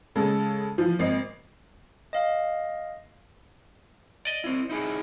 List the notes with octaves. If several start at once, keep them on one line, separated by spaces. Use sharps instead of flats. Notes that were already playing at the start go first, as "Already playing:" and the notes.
C#3 G#3 A4
E3 F3
G#1 C4 D#5 C7
D#5 F5
D5 D#5
C4 E4
D#4 E4 G#4